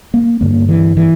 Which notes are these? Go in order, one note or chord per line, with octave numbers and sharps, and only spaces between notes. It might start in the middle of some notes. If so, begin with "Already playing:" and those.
A#3
G2 D3 A#3
E3
E3